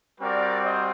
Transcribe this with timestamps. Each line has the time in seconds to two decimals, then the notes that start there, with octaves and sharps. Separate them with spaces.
0.21 G3 C4 F#4 A#4 D5
0.63 C5 D#5